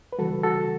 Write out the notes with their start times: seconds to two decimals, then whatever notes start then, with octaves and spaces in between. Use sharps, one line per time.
0.13 B4
0.18 C#3 E3 G3 F#4 A4
0.43 F#4 A4